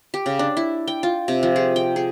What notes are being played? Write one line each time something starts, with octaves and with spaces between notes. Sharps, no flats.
G4
C#3
D4
E4
G5
F4
C3
F3
G#4
G5
G#4